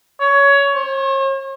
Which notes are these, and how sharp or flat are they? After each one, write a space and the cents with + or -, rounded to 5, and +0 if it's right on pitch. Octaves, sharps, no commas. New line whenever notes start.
C#5 +20
C#5 -45